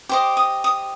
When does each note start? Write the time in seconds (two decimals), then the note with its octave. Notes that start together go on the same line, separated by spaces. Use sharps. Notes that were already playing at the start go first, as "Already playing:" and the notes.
0.09 G4 C5 D#5 D6
0.37 D#6
0.64 D#6